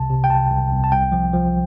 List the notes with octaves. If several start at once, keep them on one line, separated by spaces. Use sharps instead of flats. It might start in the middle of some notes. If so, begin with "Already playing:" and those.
Already playing: C2 C3 A5
C3
G5
C2 A5
C2
C2
A5
C2 G5
F3
F3